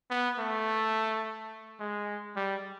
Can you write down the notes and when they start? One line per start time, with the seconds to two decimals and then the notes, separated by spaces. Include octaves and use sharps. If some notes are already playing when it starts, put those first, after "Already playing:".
0.10 B3
0.39 A3
1.80 G#3
2.36 G3